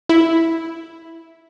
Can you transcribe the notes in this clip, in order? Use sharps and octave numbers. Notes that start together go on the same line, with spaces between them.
E4